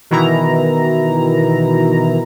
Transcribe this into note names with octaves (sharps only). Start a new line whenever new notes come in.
B2 D#3 E3 E4 A#5